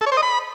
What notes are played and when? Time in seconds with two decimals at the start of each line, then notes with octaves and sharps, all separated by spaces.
0.01 A4
0.06 C#5
0.12 C5
0.17 D#5
0.22 B5